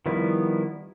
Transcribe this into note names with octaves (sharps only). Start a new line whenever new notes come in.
D#3 F3 G3 B3 E4